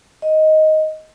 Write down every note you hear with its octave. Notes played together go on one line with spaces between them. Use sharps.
D#5